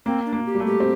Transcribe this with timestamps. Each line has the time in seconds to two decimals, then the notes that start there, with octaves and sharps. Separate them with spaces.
0.06 A#3 C4
0.26 D4
0.33 A#3
0.46 G4
0.55 G3
0.60 A3
0.66 G4
0.80 C4